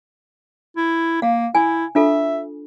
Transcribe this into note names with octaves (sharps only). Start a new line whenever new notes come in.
E4
A#3 F5
E4 G#5
D4 F4 A4 E5